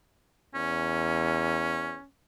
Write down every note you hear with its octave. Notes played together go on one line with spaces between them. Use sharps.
E2 C#4